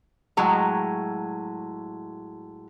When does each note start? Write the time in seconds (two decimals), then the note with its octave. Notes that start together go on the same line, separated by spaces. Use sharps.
0.37 A2 F#3 G#3 A#5